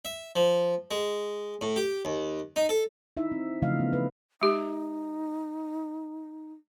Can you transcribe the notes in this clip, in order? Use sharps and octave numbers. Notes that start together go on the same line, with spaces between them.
E5
F3
G#3
A2
G4
D#2
D#4
A4
D#4 E4 E5
C4
C#3 E3 F3 A3 D#5 F5
B3
B4
G#3 D#4 G4